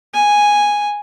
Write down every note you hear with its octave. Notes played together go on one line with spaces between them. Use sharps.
G#5